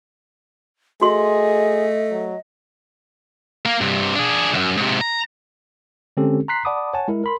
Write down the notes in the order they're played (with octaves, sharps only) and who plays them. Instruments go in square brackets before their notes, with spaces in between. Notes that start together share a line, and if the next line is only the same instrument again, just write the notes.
[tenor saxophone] A3 [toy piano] F#4 C6 [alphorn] G#4 [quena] D#5
[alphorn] F#3
[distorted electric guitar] A#3 A#4
G2 C3
D4 G#4
C#2 F#2
G#2 C3
A#5
[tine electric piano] D3 G#3 C4 C#4 G4 A4
A#5 C6 F#6 B6 C7
D5 F#5 A5 B5 D6 D#6
C#5 F#5 G#5 A5
G#3 E4 A#4
A#4 B5 C6